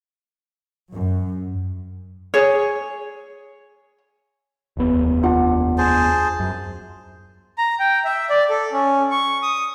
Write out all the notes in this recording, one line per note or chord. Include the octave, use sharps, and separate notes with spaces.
F#2
G#4 C#5
F1 D#2 B3
D4 F4 F#5
G#4 C5 A5
F#2
A#5
G5
E5
D5
A4
C#4
C#6
D#6